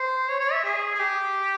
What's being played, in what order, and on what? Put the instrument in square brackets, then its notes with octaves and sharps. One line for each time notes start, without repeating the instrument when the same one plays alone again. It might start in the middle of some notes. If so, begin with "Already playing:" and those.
Already playing: [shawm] C5
C#5
C#5
E5
G#4
G#4
G4